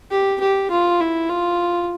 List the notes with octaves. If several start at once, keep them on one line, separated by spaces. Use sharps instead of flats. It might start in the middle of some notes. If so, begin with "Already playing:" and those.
G4
G4
F4
E4
F4